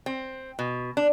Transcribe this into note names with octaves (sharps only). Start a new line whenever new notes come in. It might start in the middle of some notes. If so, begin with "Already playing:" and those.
C4
B2
D4